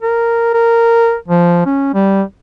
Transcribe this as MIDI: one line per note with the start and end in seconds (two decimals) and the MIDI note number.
0.02 0.52 70
0.54 1.15 70
1.28 1.64 53
1.66 1.94 61
1.94 2.22 55